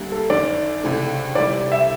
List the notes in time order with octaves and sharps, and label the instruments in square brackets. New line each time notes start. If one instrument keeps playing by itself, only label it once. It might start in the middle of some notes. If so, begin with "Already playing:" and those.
Already playing: [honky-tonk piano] D2 D3 G3 A#3
[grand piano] A4
[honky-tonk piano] G1 F#2 D#3 [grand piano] D5
[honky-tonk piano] C#2 C3 E3 A3
[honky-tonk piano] D2 C3 E3 G3 [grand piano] D5
[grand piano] E5